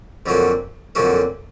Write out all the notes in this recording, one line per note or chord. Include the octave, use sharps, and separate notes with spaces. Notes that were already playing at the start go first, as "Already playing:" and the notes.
F2 D3 F#3 A#3 C#4
F2 D3 F#3 A#3 C#4